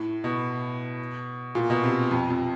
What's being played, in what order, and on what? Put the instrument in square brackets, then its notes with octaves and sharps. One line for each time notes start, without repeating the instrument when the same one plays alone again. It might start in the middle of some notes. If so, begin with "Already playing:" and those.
Already playing: [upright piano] A2
B2
A#2
B2
C3
F2
F2